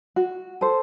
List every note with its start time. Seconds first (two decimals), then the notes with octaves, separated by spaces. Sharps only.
0.16 F#4
0.61 A4 C5